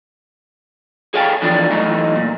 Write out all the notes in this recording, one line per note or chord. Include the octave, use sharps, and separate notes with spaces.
G#4 A4 C#5 F5 G5 G#5
D3 E3 F3 D4
E3 F#3 A3 D#4
A#2